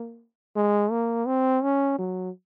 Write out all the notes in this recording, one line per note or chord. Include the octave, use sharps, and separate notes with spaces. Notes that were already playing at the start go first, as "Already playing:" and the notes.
Already playing: A#3
G#3
A#3
C4
C#4
F#3